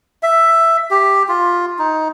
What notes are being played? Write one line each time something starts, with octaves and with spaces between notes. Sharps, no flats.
E5
G4
F4
D#4